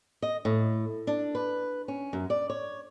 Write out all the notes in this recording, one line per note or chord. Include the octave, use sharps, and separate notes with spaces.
D#5
A2
D4
B4
C#4
F#2
D5
C#5